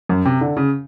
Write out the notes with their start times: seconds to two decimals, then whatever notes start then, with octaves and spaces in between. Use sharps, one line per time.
0.09 F#2
0.25 C3
0.41 D3
0.57 C#3